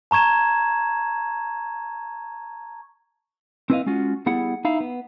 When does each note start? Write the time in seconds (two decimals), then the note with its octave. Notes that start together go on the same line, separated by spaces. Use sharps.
0.11 A5 A#5 C#6 G#6 E7
3.70 C4 E4 B4 D5 D#5 F5
3.86 G#3 C#4 F4 F#4
4.26 G3 B3 E4 G#4 F#5
4.65 D#4 E4 F5
4.80 B3